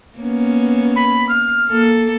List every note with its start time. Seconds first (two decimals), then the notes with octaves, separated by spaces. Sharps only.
0.19 A#3 B3 C#4
0.96 B5
1.29 F6
1.69 A#3 A4